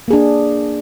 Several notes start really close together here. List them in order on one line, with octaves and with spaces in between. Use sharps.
A#3 G#4 D4